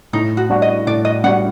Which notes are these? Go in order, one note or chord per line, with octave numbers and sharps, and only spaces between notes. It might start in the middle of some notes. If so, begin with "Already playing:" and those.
A2 D#4
F#4
G3 D4 F#4
D#5
A2 D5
D#5
G3 D4 F#4 F#5